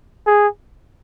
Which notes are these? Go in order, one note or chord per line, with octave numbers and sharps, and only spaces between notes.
G#4